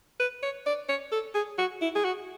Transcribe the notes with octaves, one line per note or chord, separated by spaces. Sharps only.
B4
C#5
D5
C#5
A4
G#4
F#4
E4
G#4
F#4